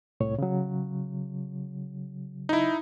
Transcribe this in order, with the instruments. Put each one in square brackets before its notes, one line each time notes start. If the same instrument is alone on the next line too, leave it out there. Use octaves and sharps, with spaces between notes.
[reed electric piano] C2 A2 C#5
C#3 F#3
[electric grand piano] D#4 E4